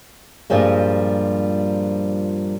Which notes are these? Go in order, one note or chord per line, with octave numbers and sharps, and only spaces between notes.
G2 A#2 F3 G3 G#3